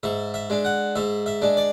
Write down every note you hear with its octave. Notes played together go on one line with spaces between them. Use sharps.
G#2 E5
E5
G#3 D4
F#5
G#2 E5
E5
G#3 D4
D5